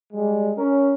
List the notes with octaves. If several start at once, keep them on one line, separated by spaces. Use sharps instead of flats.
G3 G#3
C#4 A#4